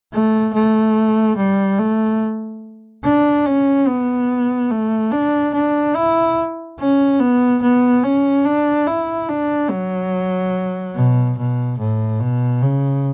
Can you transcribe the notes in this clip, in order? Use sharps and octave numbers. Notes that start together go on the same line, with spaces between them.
A3
A3
G3
A3
D4
C#4
B3
A3
D4
D4
E4
C#4
B3
B3
C#4
D4
E4
D4
F#3
B2
B2
A2
B2
C#3